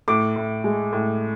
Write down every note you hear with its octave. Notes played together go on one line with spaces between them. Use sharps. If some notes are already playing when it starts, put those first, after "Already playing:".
A2 D6
A2
G#3
A2